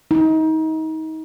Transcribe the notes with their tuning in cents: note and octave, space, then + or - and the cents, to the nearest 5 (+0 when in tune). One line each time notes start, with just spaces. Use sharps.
D#4 +30